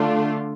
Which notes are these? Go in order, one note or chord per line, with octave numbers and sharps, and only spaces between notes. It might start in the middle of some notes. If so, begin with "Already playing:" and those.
Already playing: D3 A3 D4 F4